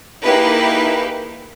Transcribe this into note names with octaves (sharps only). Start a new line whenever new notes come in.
A#3 D#4 E4 G4 G#4 B4